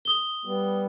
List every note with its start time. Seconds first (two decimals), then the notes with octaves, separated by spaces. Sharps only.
0.05 D#6 G7
0.45 G3 B3